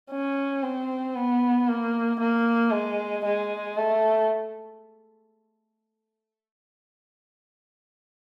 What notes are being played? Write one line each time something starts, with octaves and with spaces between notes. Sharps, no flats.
C#4
C4
B3
A#3
A#3
G#3
G#3
A3